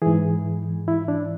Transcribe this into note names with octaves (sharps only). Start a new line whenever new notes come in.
G#2 E3 G#4
E4
D4